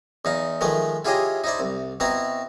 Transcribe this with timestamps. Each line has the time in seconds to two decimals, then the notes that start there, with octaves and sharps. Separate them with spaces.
0.25 E2 D#4 F5
0.61 D#3 F3 G#3 A3 B4
1.05 E4 F4 G4 G#4 C#5 D#5
1.44 D#4 E4 C5 D5
1.60 C2
2.00 B2 C4 E4 B4 A#5